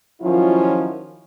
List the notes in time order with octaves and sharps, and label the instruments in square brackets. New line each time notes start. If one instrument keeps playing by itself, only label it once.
[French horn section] D#3 F3 F#3 C#4 E4 F4